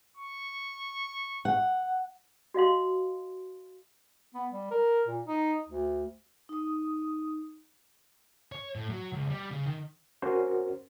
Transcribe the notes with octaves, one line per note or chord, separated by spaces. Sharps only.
C#6
F#5
F#4 D#5 F5 C6
B3
G3
A#4
A#2
D#4
D2
D#4 D#6
C#5
A2
F#3
C#2
G3
C#3
D#3
C#4 F#4 A#4 C5